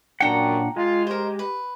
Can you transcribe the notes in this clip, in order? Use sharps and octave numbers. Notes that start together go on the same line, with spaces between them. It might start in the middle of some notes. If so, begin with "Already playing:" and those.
F#2 A#2 D4 F#5 G5 A#5
G#3 F4
G4 A#4 C5
B4